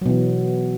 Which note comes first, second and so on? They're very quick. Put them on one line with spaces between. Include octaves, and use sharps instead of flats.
F#3 B2 E3